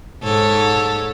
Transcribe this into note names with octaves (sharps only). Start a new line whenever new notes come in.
G#2 A4 C#5